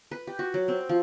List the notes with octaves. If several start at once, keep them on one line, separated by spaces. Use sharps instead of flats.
B4
G4
F#4
F#3
C4
F3